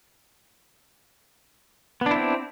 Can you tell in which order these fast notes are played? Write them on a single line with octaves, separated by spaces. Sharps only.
B3 D4 E4 C4